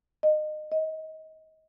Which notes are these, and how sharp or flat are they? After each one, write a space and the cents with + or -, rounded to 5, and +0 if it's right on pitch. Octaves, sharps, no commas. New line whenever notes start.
D#5 -25
D#5 +25